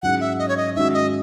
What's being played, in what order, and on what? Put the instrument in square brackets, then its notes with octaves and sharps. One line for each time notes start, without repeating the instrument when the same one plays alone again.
[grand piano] G#2 F#3 C#4 E4 G#4 [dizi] F#5
[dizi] E5
D#5
C#5
D#5
[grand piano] G#2 D#3 G#3 C#4 F#4 [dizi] E5
[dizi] D#5